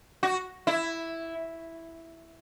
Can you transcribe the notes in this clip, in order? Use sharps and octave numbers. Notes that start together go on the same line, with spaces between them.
F#4
E4